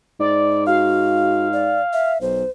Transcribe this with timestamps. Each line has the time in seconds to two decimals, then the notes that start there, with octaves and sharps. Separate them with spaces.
0.20 G#2 D5
0.67 F#4 F5
1.53 D5
1.93 E5
2.21 B1 C5